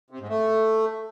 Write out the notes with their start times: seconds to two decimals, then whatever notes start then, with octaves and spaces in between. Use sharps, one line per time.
0.10 C3
0.19 G#2
0.29 A3